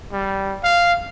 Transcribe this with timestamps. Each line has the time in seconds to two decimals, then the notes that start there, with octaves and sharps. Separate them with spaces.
0.12 G3
0.64 F5